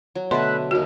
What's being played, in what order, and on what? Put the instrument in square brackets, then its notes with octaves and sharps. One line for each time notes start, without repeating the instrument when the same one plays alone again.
[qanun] F#3
[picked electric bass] B2 [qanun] D3 E5 A5 [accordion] A3 B5 F#6 [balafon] C6
[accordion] D#2 F6 [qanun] A#3 D#4 [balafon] F#4